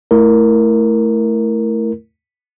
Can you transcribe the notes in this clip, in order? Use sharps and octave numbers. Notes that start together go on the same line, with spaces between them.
A3 E4 A#4